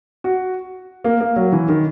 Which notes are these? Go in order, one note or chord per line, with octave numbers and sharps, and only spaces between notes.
F#4
A#3
A#3
F#3
E3
D#3